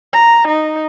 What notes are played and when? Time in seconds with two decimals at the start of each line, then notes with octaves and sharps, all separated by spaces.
0.13 A#5
0.48 D#4